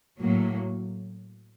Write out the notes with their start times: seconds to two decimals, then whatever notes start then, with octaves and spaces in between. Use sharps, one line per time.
0.19 A2 F#3 A#3